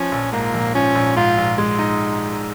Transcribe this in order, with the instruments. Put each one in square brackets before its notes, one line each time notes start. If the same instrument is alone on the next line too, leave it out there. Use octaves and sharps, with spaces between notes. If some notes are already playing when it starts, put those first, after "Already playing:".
Already playing: [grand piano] F3 [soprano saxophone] C#4
[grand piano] A#1
[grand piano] G#2 [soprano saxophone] A#3
[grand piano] A#1
[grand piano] F3 [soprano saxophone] C#4
[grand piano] A#1
[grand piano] G#2 [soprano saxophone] F4
[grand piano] A#1
G#3
D#4